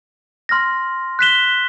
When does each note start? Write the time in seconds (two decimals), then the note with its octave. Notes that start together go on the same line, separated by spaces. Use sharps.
0.49 C6 F6 A#6
1.19 F#6 B6 E7 G7